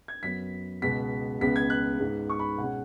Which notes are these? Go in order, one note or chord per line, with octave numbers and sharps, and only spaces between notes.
G#6
F#2 F#3 B3 B6
C#2 B2 G#3 B3 B6
C#2 C#3 G#3 B3 B6
G#6
F#6
G#2 G#3 B3
C#6
B5
B2 G#3 C#4 F#5